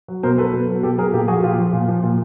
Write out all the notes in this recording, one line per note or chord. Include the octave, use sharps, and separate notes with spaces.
F#3
B2 A#4 C5
F#3 A4 B4
B2
F#3
B2 G4 A4
F#3 G#4 A#4
A#2 G4 A4
F3 F#4 G#4
A#2 F4 G4
F3
A#2
F3
A#2